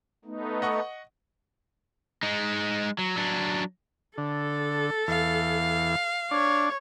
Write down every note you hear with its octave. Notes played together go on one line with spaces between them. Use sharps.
A3 B3 D#4
D#5 F#5 C#6
G#3 D#4
F#3
F#3 D4
D3 A4
E2 F5
D4 C#5